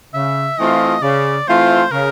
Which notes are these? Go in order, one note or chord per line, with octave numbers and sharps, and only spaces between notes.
C#3 E5
E3 A3 C4 F4 D#5
C#3 D5
E3 A3 C4 F4 C5
C#3 A#4